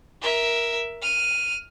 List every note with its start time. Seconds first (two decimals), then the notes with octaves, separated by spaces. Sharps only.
0.21 A#4 E5
1.02 F6 D#7